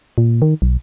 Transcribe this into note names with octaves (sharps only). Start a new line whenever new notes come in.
A#2
D#3
B1